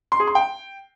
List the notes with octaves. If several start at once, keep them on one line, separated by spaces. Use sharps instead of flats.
C6
G#4
C6
G5